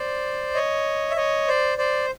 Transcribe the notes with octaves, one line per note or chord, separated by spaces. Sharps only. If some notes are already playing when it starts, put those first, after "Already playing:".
Already playing: C5 D5
C#5 D#5
E5
C#5 D#5
C5 D5
C5 D5